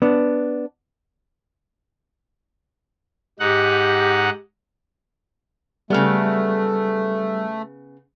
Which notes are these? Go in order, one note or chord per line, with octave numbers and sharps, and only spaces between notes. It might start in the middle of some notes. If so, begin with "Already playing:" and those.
B3 D4
G#2 D#4 G4 F#5
C#3 G3 A3 B3 F6